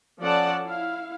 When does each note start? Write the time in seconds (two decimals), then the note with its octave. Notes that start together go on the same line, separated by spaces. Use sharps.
0.21 F3 C#4 A4 D5 F#5 A5
0.66 E4 F5